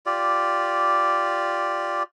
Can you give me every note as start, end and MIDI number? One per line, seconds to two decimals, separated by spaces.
0.06 2.03 65
0.06 2.03 67
0.06 2.03 74